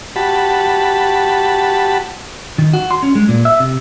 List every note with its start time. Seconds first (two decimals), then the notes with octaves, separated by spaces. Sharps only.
0.16 F#4 G4 A5 B5
2.58 D#3
2.73 F#4
2.91 C6
3.03 C#4
3.15 G#3
3.28 A#2
3.45 E5
3.60 C3